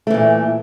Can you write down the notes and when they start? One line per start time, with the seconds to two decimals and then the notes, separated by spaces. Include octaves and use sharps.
0.07 A3
0.10 E3
0.14 A#2